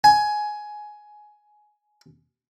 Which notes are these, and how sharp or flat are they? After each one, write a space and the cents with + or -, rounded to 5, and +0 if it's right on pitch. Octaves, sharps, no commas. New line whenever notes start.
G#5 +15